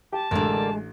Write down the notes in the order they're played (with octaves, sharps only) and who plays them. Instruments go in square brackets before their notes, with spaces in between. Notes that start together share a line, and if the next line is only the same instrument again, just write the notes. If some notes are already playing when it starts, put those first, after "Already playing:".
[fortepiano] G4 [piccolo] A5
[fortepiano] A1 D4 [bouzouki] D3 A#3 [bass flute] G#3